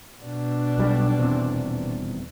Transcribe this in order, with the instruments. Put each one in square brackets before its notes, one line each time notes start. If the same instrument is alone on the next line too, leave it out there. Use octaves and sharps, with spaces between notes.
[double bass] B2 D4
[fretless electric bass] B1 G3
D#1 E2 C3